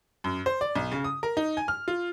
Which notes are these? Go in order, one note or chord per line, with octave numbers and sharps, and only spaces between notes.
F#2
C5
D5
B1
C#3
D#6
A#4
D#4
G#5
F6
F4